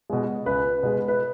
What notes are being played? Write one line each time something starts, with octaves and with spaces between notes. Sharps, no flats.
B2 G#3
C#2 B4
B2 G#3
B4